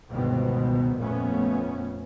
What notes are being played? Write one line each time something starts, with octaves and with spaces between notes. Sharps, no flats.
G1 C#2 B2 D#3 B3 C4
F2 A#2 A3 B3 C#4